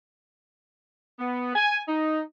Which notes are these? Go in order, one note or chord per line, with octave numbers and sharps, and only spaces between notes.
B3
G#5
D#4